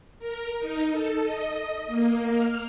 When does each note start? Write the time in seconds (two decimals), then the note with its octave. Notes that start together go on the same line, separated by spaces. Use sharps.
0.19 A#4
0.59 D#4
0.91 A4
1.22 D#5
1.87 A#3
2.36 F6